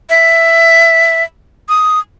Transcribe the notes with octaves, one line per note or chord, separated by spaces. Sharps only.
E5
D#6